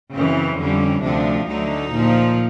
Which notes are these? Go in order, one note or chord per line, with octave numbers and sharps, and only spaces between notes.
F#2 C#3 E3 C4
F2 D3 G3 C#4
D2 C3 F3 D4
D2 D3 F#3 D#4
A#2 F3